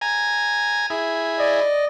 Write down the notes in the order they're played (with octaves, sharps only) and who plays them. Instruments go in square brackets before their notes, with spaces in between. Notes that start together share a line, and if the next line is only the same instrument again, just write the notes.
[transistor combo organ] G#5 A#5
E4 G#4
[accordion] D5 D#5